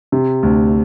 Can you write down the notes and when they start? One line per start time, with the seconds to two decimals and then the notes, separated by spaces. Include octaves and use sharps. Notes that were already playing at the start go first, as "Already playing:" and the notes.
0.12 C3
0.43 D2